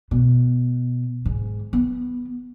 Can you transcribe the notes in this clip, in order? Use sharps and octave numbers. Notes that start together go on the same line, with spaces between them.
B2
G#2
B3